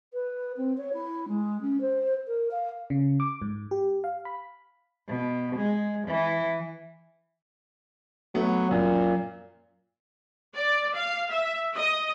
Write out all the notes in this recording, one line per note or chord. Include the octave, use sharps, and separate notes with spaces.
B4
C4
C#5
E4
G#3
C#4
C5
A#4
F5
C#3
D6
G#2
G4
F5
B5
B2
G#3
E3
F#3 A3 B3
F#2 A#2
D5
F5
E5
D#5